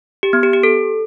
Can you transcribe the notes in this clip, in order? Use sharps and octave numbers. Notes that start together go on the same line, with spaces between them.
G4
B3
G4
G4
A4